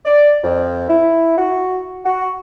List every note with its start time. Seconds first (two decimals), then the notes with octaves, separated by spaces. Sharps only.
0.05 D5
0.43 F2
0.89 E4
1.37 F#4
2.05 F#4